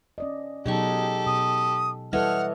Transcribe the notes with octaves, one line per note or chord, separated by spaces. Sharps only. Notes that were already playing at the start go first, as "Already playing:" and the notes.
C#4 D5 D#5
B2 F#3 G#3 D#4 G4 A4 C#6
B2 D#6
E3 G3 A4 C#5 D#5 F#5 F6